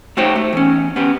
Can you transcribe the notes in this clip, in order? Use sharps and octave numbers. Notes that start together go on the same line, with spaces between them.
A3 D#4 F#4 G4 C5 C#5
A3
E2 C#4
B3 C#4 G4